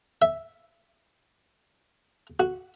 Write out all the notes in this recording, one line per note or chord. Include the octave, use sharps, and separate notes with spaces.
E5
F#4